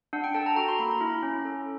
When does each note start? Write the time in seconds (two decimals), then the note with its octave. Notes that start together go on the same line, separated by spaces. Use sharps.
0.13 D4 F#5
0.24 G5
0.34 A4 A5
0.46 A#5
0.56 F#4 A#5
0.68 C6
0.79 A#3 B5
0.91 A#5
1.01 E4
1.23 C#4
1.45 A4